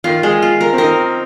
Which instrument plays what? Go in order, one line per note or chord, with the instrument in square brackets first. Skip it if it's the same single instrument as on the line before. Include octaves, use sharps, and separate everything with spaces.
[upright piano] D#3 [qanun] F4
[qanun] G#3
F4
A#4
[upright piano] C4
[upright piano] D#4 [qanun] A#4